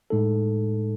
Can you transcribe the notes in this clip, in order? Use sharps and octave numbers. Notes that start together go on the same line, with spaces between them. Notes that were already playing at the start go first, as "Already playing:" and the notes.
A2 G#3 D#4 A4